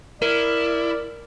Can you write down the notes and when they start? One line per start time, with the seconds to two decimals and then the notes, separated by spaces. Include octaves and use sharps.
0.22 E4 A#4 D5